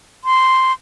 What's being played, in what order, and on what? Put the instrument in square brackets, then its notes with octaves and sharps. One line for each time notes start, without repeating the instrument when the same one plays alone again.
[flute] C6